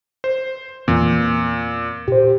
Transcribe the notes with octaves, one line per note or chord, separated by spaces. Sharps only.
C5
E2 A#2 E3 C4
A#2 G4 C5